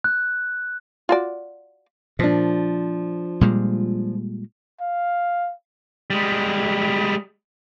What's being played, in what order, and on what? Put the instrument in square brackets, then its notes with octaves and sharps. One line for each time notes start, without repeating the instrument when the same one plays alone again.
[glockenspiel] F#6
[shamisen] F4 F#4 D5
[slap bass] A#2 [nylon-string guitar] F3 D4
[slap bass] A#2 G3 G#3
[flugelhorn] F5
[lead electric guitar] G3 G#3